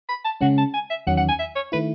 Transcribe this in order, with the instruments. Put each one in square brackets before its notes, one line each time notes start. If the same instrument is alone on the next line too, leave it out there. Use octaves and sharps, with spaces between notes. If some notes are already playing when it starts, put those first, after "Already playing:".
[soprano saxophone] B5
A5
[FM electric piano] C#3 G#3 C#4 [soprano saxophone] F#5
[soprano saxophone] A5
G#5
E5
[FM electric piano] E2 D#3 F#3 C#4 [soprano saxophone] F#5
[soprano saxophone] F#5
G#5
E5
C#5
[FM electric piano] D#3 A3 E4 [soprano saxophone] B4